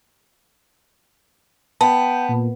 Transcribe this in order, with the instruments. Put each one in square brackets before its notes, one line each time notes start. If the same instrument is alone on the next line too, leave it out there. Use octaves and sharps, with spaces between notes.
[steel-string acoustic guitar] B3 [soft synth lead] G5 [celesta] A5
[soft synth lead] A#2